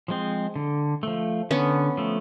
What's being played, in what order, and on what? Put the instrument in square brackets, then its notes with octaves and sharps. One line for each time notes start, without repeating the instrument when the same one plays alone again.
[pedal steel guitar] F3 G#3 C4
D3
F3 A3
[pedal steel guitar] D3 [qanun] B3 C#4
[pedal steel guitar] F3 A3